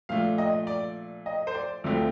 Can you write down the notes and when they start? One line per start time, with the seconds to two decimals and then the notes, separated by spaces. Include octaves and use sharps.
0.09 A#2 F3 A3 D4 F5
0.38 D#5
0.67 D5
1.26 D#5
1.47 C5
1.55 D5
1.84 D2 D3 F3 A3 C4 D5